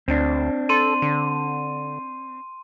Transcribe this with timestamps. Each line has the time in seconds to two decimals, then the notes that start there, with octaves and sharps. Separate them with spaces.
0.08 D2 C4 D4
0.69 A4 C6 D#7
1.02 D3